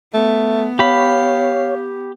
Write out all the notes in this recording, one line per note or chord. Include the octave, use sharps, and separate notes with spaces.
A3 B3
G4 C#5 F5 B5